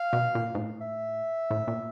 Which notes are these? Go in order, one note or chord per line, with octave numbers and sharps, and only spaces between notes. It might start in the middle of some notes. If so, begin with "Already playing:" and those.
Already playing: F5
B2
A#2
G#2
A2
E5
A2
A#2